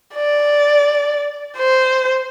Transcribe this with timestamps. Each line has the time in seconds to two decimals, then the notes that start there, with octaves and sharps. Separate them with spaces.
0.15 D5
1.58 C5